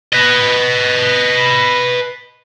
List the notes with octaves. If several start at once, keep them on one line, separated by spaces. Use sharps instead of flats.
B4 D#5